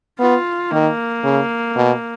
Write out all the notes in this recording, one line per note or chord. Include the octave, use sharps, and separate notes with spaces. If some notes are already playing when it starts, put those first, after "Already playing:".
B3 F4
D#3 A#3
C#3
B2